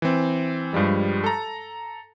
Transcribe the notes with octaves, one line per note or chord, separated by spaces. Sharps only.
E3 C4
G2 F3 G3 G#3
A4 A#5